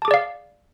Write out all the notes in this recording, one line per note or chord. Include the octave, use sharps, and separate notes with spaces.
G#4 D5 F5 A5 D6